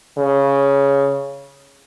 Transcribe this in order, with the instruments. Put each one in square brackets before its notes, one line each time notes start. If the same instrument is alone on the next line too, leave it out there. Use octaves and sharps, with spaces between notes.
[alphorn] C#3